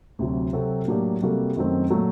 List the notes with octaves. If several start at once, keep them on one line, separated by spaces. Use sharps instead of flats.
D2 C3 F#3
C3 F#3 C4 F#4 A4
A2 F#3 A#3 D4 G4
C3 G3 A#3 F#4 A4
F#2 D#3 F#3 A3 C4
A#2 F#3 A3